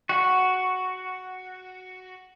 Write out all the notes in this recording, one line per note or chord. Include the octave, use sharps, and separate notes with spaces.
F#4 F#5